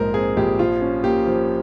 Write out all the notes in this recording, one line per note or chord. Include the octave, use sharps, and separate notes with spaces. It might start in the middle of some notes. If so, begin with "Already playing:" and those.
Already playing: A#1 G#2 A#4 C5
C4 G#4
A#1 G4
F3 F4
C#4
A#3 G4
F3